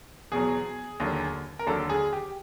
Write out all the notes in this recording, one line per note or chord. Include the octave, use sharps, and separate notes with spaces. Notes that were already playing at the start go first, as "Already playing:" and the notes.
E2 B2 F#3 G#4
D#2 D3 F#3
A#4
D#2 D3 F#3 A4
G#4
G4